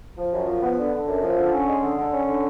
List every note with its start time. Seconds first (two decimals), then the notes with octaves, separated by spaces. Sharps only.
0.18 F3
0.33 F#2
0.48 F3
0.62 B3
0.77 D3
0.93 D3
1.07 F#2
1.23 F3
1.38 D3
1.53 C#4
1.67 G#3
1.82 D3
1.98 D3
2.12 C#4
2.27 D3